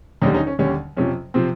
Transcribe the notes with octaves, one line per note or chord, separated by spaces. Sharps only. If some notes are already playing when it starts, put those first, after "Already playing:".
D#2 D3 G3 C#4 D#4
C#4 D#4
C#4
D#2 D3 G3 C#4
F2 C3 F3 C#4
C3 F3 C4